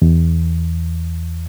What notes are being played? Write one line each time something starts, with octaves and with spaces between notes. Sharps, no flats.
E2